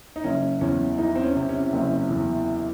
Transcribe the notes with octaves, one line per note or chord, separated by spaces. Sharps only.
D#4
F#1 C#4
E2 C#4
E3 D#4
C4
C#4
C3
C#4
F#1
E2